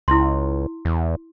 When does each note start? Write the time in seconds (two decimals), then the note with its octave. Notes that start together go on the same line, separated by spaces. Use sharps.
0.08 C#2 E4 C6
0.85 E2